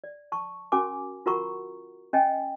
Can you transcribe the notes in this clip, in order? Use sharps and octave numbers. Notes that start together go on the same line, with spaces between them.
D5
A5 C#6
C#4 F#4 A#4 G#5 D6
F4 F#4 A#4 F#5 A#5 C#6
C#4 D#5 G5 G#5